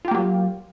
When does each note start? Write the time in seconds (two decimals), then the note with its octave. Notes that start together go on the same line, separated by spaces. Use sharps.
0.05 F4
0.08 G4
0.11 A#3
0.15 F#3